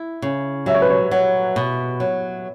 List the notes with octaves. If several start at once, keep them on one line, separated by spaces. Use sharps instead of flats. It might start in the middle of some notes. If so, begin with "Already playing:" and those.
Already playing: E4
C#3
F#3 E5
C#5
B4
C#5
F#3
B2
F#3